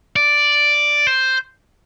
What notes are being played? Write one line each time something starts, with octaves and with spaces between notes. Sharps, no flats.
D5
C5